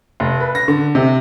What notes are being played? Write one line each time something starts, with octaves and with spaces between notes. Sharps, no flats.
F1
B4
A#6
D3
C3